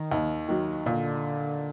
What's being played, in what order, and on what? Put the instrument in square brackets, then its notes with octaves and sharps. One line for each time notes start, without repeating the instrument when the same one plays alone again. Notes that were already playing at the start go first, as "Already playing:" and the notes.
Already playing: [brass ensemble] D#3
[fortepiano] D#2
D#3 F#3
[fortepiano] A#2 [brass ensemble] D3